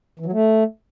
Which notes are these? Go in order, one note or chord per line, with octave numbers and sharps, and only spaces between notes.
E3
F#3
A3